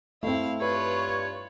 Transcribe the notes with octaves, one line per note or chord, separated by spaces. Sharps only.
A3 C4 E4 F5
G2 F4 B4 C#5